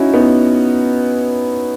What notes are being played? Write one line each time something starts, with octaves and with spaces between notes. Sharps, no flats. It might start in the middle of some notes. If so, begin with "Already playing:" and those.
Already playing: C#4 D#4 E4 F#4
B3 D#4